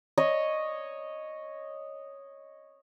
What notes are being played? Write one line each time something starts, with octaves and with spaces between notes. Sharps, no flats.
C#5 D#5